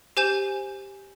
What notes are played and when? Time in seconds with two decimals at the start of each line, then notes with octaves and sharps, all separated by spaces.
0.17 G4 C5 G#5 G6 E7